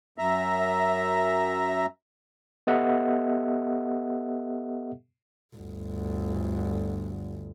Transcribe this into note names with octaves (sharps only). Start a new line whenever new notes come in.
F#2 E5 A#5
B3 G4 A4 D#5 E5 F#5
G1 D2